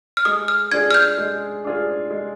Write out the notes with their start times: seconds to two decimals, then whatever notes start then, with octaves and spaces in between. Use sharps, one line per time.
0.17 F6
0.25 G#3 D#6
0.48 F6
0.71 D4 F4 G#4 G#6
0.91 F6
0.94 G6
1.18 G#3
1.64 D4 F4 G#4
2.11 G#3